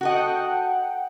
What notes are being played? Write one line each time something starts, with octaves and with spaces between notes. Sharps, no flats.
F#4 A4 D#5 F#5 G5